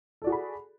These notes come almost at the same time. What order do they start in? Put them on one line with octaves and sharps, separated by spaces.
A4 D5 F#4 G#4 B5